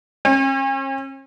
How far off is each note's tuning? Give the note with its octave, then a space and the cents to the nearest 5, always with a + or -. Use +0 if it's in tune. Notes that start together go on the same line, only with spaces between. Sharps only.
C#4 -45